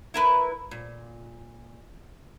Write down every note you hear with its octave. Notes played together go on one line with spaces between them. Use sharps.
E4 A#4 B4
A#2